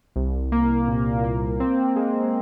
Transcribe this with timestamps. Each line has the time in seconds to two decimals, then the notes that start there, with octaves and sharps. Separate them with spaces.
0.16 C2
0.52 A#3
0.88 A#2
1.24 A#3
1.60 C4
1.96 G#3